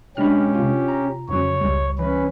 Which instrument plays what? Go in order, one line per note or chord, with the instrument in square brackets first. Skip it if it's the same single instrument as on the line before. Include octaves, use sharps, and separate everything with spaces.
[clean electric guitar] B2 G#3 B5 [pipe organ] C#4 G4 [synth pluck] D4 F6
[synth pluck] C3 F4
[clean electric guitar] A#5
[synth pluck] F2 C#3 F#3 [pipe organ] C#5
[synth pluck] C#2 G3
[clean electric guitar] E3 [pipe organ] C#4 B4